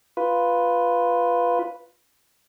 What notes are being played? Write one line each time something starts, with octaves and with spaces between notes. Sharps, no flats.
F4 B4